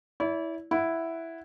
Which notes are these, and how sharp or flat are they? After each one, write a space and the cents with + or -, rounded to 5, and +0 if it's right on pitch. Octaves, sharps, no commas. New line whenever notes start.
E4 -10 D5 -45
E4 +0 F#5 +0